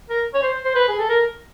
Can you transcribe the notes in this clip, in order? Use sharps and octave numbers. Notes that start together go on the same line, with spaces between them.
A#4
C#5
C5
C5
B4
G#4
A4
A#4